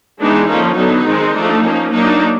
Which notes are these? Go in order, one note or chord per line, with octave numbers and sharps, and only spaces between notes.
E3 G#3 B3 D4 D#4
D3 F3 A#3 C#4 D#4
D3 F#3 B3 D#4
D#3 G#3 C4
F3 A3 D4
F3 A#3 C#4
F#3 A#3 D4 D#4